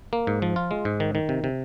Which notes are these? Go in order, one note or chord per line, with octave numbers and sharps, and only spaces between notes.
A#3
G#2
F3
F4
G#3
G#2
D#3
D#3
C3
C3